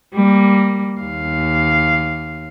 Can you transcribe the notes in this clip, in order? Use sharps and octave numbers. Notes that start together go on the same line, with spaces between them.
G3 A#3
D#2 F5